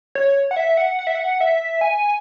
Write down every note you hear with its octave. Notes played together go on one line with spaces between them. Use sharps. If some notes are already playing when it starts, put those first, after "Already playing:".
C#5
F#5
E5
F#5
F#5
E5
F#5
E5
G#5